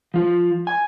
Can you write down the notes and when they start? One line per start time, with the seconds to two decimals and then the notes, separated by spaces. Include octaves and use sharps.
0.14 F3 F4
0.67 G#5